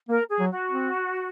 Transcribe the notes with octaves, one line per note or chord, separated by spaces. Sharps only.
A#3 A#4
G#4
F#3
F#4
C4